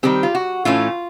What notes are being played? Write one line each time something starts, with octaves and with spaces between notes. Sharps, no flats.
D#3 G3 C4 G4
F4
F#4
A2 E3 A3 C#4 F4